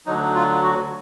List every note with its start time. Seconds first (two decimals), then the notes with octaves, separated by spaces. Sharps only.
0.06 D2 D3 F#3 D#4
0.35 F4
0.63 F#4